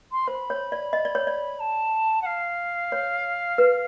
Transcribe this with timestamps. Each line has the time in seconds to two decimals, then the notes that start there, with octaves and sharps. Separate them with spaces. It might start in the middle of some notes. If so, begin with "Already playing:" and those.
0.11 C6
0.27 C5 B5
0.50 C#5
0.72 D5
0.93 D#5
1.05 D5
1.15 C#5
1.27 D5
1.60 A5
2.21 F#5
2.25 F5
2.92 C#5
3.58 B4